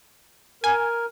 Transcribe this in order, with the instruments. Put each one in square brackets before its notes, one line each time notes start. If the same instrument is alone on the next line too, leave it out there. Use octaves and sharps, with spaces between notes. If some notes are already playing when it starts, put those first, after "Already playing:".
[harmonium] A#4 [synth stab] G#5